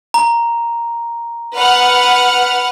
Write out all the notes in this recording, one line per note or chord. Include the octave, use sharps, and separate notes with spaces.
A#5
B4 F#5 F6